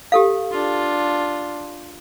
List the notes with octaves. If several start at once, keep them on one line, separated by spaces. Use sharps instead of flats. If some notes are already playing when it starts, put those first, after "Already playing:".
G4 A4 F5
D4 F4